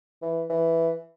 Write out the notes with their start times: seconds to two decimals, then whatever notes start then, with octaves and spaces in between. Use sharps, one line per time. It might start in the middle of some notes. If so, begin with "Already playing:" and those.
0.22 E3
0.50 E3